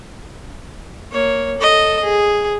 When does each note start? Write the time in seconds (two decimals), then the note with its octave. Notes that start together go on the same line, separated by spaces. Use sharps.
1.12 A#3 C#5
1.58 A4 D#5
2.03 G#4